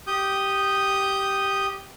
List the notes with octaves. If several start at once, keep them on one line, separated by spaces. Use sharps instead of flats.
G4 D#6 G6